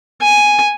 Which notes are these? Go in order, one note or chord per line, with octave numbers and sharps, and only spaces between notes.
G#5